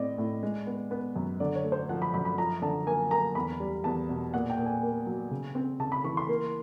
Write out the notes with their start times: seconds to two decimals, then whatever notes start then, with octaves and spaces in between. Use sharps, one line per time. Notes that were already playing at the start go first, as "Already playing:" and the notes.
Already playing: A2 C4 D5 D#5
0.18 A2
0.43 G#3
0.67 B3
0.91 B3
1.16 F#2
1.40 D3 D5
1.56 C#5
1.64 A3
1.72 C5
1.89 F3 F#5
2.02 B5
2.14 F#2 B5
2.25 B5
2.38 F3 A#5
2.62 D3 A5
2.86 A#3 G#5
3.11 A#3 A#5
3.35 E2 B5
3.60 G3
3.84 E2 A5
4.09 B2
4.34 A#2 F#5
4.50 G5
4.57 A#2
4.66 G#5
4.83 A#3
5.06 F#3
5.31 C#3
5.55 C4
5.79 C#3 A5
5.92 B5
6.04 E3 C#6
6.17 C6
6.29 A#3